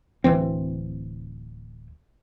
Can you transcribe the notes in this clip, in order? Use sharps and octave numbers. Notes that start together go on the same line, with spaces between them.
D1 B1 E3 C4